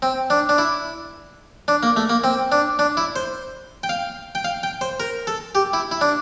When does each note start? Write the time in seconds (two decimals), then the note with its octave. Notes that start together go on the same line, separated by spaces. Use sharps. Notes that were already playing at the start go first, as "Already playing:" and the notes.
0.02 C4
0.30 D4
0.49 D4
0.58 E4
1.68 D4
1.83 A#3
1.96 A3
2.09 A#3
2.24 C4
2.52 D4
2.79 D4
2.97 E4
3.16 C5
3.83 G5
3.89 F5
4.35 G5
4.45 F5
4.63 G5
4.81 C5
5.00 A#4
5.27 A4
5.55 G4
5.73 E4
5.91 E4
6.01 D4